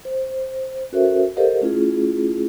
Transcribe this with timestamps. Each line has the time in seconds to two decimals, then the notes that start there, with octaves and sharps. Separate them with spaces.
0.05 C5
0.92 C#4 F#4 A4 A#4 C5 E5
1.37 G4 A4 A#4 C5 D#5 F5
1.61 A3 C#4 E4 F4 G#4